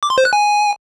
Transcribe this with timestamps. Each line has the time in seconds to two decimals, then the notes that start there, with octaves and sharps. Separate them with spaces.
0.03 D6
0.10 C6
0.18 C5
0.25 F#6
0.33 G#5